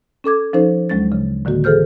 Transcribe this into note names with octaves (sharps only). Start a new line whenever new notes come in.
C#4 A4 D6 G#6
F3 C#4 D#4 A4 C5
D2 F#3 G#3 C#4 A6
C#3
A2 D3 D#3 A#3 F#4
E3 G#4 A4 C5 F6 G6